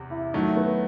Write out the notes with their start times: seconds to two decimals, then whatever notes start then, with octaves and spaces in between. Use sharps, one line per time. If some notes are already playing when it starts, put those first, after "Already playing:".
Already playing: E2 C3 G4
0.10 E4
0.33 D#3 F#3 A3 D#4
0.57 B3